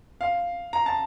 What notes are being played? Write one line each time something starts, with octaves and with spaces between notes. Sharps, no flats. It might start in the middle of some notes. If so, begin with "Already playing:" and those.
F5
A#5
A5